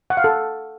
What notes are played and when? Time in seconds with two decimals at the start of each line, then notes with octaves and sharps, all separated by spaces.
0.10 F#5
0.17 F5
0.24 A4